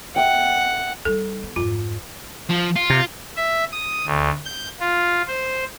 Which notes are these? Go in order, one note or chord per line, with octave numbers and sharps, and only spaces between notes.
E5 F#5 G5
G3 D#4 A4
B3
F2 G#2 F4
F3
F4
C3
E5
D#6
D2
G6
F4
C5